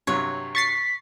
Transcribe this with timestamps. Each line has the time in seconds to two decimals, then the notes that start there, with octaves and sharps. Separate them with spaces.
0.07 G2 C3 F#3 C#5
0.55 C#6 A6 B6 C7